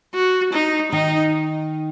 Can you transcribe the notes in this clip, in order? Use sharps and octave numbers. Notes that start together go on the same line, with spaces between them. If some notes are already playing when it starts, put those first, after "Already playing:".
F#4
D#4
D#3 D#4